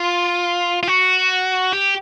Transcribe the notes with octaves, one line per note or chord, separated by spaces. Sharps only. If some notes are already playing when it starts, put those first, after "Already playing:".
Already playing: F4
F4
F#4
G4